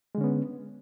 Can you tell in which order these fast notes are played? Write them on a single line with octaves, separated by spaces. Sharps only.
G#3 D3 C#4 B3